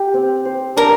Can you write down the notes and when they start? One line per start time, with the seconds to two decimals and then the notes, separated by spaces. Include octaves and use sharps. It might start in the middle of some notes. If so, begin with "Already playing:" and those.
Already playing: G4
0.14 C4
0.45 C5
0.77 D4 A#4